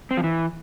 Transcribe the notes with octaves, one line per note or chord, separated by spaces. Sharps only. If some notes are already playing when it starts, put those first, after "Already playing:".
C4
F3
E3